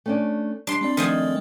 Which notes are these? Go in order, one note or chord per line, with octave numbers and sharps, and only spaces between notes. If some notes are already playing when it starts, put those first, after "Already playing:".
A3 C#4 D4
G3 D4 C6
G#3 C4 D5
D#3 F3 A3 G#4